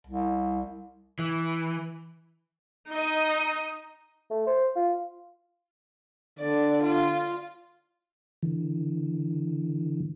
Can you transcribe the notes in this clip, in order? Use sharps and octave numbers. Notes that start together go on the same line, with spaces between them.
C2
E3
D#4 D#5
A3
C5
F4
D3 D5
F4
D3 E3